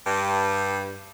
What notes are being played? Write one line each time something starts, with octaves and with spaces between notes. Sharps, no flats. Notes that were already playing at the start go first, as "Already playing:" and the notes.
G2